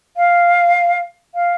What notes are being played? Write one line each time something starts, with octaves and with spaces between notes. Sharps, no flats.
F5
F5